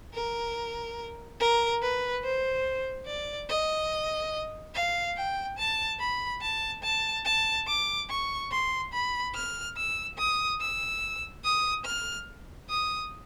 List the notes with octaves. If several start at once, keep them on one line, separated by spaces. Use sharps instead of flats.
A#4
A#4
B4
C5
D5
D#5
F5
G5
A5
B5
A5
A5
A5
D6
C#6
C6
B5
F6
E6
D#6
E6
D#6
F6
D#6